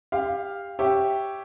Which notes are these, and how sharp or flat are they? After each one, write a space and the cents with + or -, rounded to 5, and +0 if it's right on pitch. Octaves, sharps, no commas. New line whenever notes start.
G4 +20 F5 +0
G4 +0 C#5 +0 E5 +0